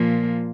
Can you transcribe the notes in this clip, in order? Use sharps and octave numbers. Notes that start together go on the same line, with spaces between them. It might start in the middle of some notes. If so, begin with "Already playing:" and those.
Already playing: A#2 F3 A#3